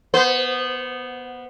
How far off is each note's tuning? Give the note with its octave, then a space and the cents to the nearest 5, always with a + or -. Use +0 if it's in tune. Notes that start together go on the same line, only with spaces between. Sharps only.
B3 -10 C5 -30